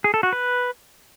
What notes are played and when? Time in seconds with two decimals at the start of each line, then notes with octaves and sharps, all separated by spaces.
0.04 G#4
0.14 A4
0.23 F#4
0.33 B4